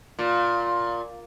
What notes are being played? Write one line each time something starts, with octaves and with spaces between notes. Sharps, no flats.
A#2